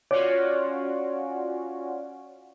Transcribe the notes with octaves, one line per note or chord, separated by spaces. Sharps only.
C#4 F4 F#4 C#5 D5